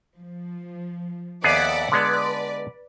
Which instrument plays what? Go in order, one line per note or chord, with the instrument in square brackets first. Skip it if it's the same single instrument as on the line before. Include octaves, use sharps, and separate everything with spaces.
[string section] F3
[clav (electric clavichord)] D#2 B3 G#4 [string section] D5 E5 F#5
[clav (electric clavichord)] D3 G#3 B3 [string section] B4 D5